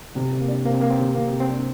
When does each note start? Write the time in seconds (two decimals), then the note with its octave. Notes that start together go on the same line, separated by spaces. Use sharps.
0.15 C3 G3
0.32 C3
0.40 A#3
0.48 D4
0.65 C3 A#3
0.73 C4
0.81 G3 A#3
0.90 C4
0.99 C3
1.15 C3 A#3
1.28 C4
1.32 C3
1.40 C4
1.49 G3 D4